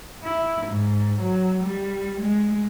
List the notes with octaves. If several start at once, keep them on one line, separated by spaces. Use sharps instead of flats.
E4
G#2
F#3
G3
G#3